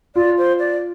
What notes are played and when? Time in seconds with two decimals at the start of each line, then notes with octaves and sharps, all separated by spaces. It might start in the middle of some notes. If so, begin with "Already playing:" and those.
0.16 F4 D5
0.38 C5
0.59 D5